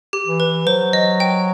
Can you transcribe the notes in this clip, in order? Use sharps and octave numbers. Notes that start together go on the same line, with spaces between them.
G4
E3
B4
F#3 C5
D#5
G5